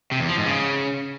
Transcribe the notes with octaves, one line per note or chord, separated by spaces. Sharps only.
C3
E2
F3
G#2
C#3